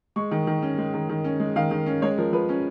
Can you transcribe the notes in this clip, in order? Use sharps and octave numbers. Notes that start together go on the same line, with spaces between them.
G#3 C#6
D#3
D#3
C#4
G#3
D#3
D#3
C#4
G#3
D#3 F5
D#3
C#4
G#3 C#5
F3 A#4
F3 B4
C#4